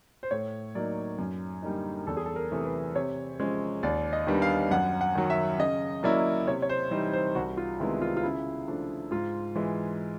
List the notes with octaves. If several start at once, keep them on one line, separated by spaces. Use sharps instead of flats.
C5
A2 C#5
F#3 A#3 D#4 D5
F#2
D3 G3 A#3 D#4
E2 A4
G#4
A4
A#4
C3 E3 A3
B4
C3 C#5
F3 G#3 C#4
D#2 D5
D#5
D#3 G3 B3 D4
F5
F#2 F#5
F#5
D#3 F#3
E5
C#3 D#5
F#3 A#3 C#4 E4 D5
C3 C#5
C#5
C5
E3 G3 C4 D#4
C5
C2 F#4
F4
C3 D#3 G#3 B3 E4
F4
F4
C#3 E4
F3 A3 D4
G#2 F4
E3 G#3